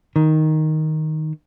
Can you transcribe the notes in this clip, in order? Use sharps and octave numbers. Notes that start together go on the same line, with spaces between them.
D#3